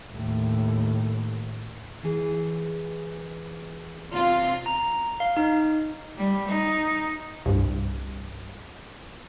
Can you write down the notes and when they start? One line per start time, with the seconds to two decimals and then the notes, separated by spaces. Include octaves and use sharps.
0.12 D#2 A2
2.03 E3 G#4
4.11 C3 F4
4.66 A#5
5.20 F5
5.37 D#4
6.17 G3
6.47 D#4
7.46 C2 G2